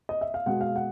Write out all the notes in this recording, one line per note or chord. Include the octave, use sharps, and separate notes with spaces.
D#5
E5
F5
B2 G#3 F#5
F5
F#5